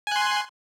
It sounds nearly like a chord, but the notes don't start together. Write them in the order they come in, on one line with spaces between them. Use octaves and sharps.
G#5 F#6 C6